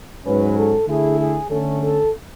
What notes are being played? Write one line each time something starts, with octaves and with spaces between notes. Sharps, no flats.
G#2 F#3 C#4 B4
A4
D3 A3 E4 G#4
G#4
D3 A3 C#4 A4
A4